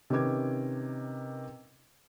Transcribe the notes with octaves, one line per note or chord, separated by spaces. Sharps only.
C3 D#3 C#4 B4 D6 G#6